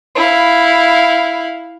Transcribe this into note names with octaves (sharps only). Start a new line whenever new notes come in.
E4 F5